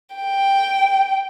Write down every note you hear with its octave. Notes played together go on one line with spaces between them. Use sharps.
G5